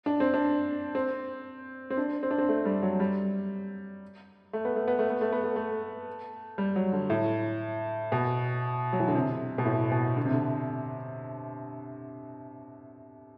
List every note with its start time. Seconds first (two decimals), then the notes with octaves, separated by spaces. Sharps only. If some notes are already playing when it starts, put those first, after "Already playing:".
0.06 D4
0.20 C4
0.34 D4
0.95 C4
1.90 C4
1.97 D4
2.23 C4
2.31 D4
2.38 C4
2.49 A3
2.65 G3
2.83 F#3
3.00 G3
4.53 A3
4.65 B3
4.76 A3
4.88 B3
4.99 A3
5.10 B3
5.21 A3
5.32 B3
5.44 A3
5.56 A3
6.58 G3
6.76 F#3
6.93 D3
7.10 A2
8.12 B2
8.93 F#3
9.00 E3
9.08 D3
9.14 C3
9.58 B2
9.65 A2
9.92 B2
10.17 D3
10.25 C3
10.34 D3